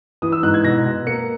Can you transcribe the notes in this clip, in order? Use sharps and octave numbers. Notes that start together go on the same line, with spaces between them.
E3 D#6
E6
G#2 F#6
G#6
B2 A#6
B2
A#3 C#7